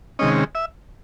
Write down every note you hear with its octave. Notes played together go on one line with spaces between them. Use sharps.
C3 D#3 G#3 C#4 D#5
E5